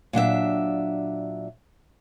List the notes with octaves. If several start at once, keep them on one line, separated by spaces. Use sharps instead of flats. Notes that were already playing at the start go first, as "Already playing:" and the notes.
A#2 F#3 D4 E5